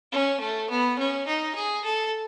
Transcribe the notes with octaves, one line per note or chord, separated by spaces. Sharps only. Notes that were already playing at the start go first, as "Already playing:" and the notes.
C#4
A3
B3
C#4
D#4
G#4
A4